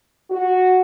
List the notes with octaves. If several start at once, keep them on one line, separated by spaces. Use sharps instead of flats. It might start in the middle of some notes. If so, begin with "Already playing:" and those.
F#4